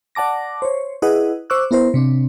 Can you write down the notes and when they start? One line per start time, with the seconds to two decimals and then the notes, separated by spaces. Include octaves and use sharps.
0.15 D5 F#5 A5 D6 A#6
0.62 C5 C#5
1.02 E4 G#4 B4 D#5 F#5
1.50 C5 C#6 D6 E6 F#6
1.71 B3 E4 A#4 C5
1.94 C3 C4 D4